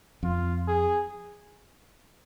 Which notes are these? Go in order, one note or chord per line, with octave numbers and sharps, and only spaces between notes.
F2 F4
G#4